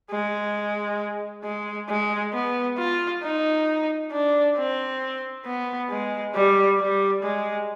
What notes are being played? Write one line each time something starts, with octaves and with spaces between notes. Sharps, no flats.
G#3
G#3
G#3
B3
F4
D#4
D4
C4
B3
G#3
G3
G3
G#3